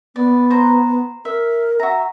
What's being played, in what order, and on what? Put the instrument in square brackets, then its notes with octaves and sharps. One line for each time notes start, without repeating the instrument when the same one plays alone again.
[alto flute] B3 [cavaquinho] D5
[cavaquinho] C5 A#5
[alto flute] A#4 [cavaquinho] E5
[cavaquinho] F#4 A#5 [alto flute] E5